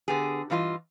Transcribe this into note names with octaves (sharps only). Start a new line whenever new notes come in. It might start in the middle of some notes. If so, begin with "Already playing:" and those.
D3 B3 G4 G#4
G2 E3 F4 G#4 D#5